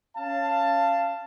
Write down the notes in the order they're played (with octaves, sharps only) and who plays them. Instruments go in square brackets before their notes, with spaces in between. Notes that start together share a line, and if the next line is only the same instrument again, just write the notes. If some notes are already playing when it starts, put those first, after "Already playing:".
[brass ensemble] C#4 F5 A5